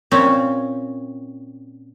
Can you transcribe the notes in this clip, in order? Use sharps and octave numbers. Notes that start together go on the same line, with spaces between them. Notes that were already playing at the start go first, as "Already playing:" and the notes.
A#2 C4 C#4